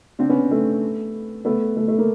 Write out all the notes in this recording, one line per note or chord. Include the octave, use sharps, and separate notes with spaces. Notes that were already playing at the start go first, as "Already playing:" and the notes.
C4 D4
B3 C#4
A3 B3
A3 B3
A3
A3
A#3